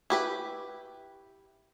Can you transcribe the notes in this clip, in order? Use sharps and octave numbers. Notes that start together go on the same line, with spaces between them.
E4 G4 B4